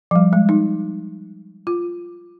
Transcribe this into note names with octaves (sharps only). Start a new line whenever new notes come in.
F3
G3
G#3
D#4
F4